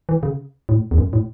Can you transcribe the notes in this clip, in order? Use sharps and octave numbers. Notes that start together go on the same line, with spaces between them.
E3
C#3
A2
E2
F#2
A2